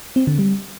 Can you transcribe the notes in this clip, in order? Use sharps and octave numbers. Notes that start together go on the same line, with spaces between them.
C4
D3
G3